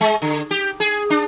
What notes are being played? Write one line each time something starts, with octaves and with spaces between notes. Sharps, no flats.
G#3
D3
G4
G#4
D4